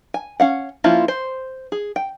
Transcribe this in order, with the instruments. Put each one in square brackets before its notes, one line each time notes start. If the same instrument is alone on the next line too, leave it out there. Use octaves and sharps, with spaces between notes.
[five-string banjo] G#5
C#4 F5 F#5
F3 A#3 C#4 E4 F4
C5
G#4
G5